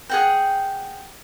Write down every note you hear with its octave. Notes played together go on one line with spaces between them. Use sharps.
G#4 F#5 G5